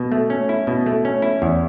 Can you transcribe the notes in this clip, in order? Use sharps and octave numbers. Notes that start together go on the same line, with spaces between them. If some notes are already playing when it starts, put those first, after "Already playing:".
Already playing: B2
A3
C#4
E4
B2
A3
C#4
E4
E2